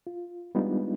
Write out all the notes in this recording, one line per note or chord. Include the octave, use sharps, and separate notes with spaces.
F4
G3 G#3 B3 D4 D#4 F4